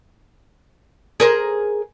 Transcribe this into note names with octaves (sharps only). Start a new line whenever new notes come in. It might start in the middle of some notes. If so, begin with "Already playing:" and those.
G#4 A#4 C5